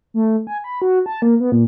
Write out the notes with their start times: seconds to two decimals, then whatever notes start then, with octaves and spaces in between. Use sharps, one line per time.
0.14 A3
0.47 G#5
0.64 B5
0.82 F#4
1.06 A5
1.22 A#3
1.40 B3
1.52 A#2